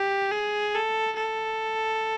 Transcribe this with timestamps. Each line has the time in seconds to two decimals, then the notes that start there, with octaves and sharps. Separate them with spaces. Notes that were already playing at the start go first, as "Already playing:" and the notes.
Already playing: G4
0.31 G#4
0.74 A4
1.16 A4